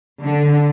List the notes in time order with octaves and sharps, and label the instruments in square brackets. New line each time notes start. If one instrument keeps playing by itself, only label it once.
[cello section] D3